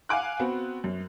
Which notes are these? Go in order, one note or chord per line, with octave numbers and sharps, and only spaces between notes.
F5 F#5 G#5 D6 F#6
B3 C4 F#4
F#2